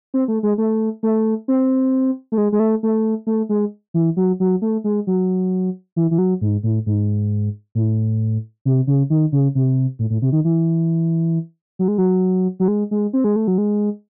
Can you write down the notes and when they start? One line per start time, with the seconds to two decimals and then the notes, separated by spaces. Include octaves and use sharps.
0.14 C4
0.28 A3
0.43 G#3
0.58 A3
1.03 A3
1.48 C4
2.32 A3
2.38 G#3
2.52 G#3
2.59 A3
2.83 A3
3.27 A3
3.49 G#3
3.94 E3
4.17 F#3
4.40 F#3
4.62 A3
4.84 G#3
5.07 F#3
5.96 E3
6.11 E3
6.18 F#3
6.41 G#2
6.63 A2
6.86 G#2
7.75 A2
8.65 C3
8.87 C#3
9.10 D#3
9.32 C#3
9.55 C3
9.99 A2
10.10 A2
10.22 C3
10.32 D#3
10.44 E3
11.79 F#3
11.88 G#3
11.98 F#3
12.60 F#3
12.68 G#3
12.91 G#3
13.13 C4
13.24 G#3
13.36 A3
13.47 F#3
13.58 G#3